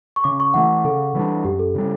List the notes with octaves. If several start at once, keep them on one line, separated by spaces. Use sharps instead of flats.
C#6
C#3 D6
C#6
E3 A3 F#5
C#3 A4
E3 G3 D4
F#2 G4
A4
C#3 G3 A4